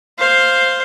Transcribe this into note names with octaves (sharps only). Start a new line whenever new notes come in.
C5 F5